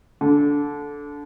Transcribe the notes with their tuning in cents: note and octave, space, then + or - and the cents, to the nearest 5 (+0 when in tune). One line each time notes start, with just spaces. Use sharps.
D3 -20